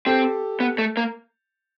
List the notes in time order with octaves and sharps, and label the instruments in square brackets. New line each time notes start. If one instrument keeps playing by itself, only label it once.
[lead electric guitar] C4 [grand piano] G4 A4
[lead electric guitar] B3
A3
A#3